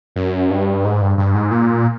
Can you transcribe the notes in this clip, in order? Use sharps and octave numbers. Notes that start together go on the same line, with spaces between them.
F#2
G2
G#2
G2
G2
G#2
A#2